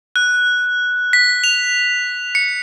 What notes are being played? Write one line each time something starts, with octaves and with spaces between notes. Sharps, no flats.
F#6
B6
F7
C#7